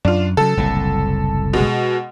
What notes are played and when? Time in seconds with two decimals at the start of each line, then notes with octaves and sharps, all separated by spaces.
0.05 F#2 D4 F4
0.37 C#3 F#3 A4
0.57 F#1 C2 A2
1.53 B2 G#3